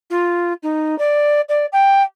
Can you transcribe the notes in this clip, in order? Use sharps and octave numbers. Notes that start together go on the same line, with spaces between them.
F4
D#4
D5
D5
G5